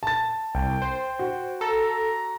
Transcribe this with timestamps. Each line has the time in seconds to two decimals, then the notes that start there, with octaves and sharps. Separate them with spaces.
0.03 A5 A6
0.55 C2 G5
0.82 C5
1.19 F#4
1.61 A4 A#5